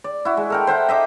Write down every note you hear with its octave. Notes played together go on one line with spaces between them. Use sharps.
D5
E4 F#4
G#3
A4 A#4 G5
C5 E5 F#5 G5
D#5 E5 D6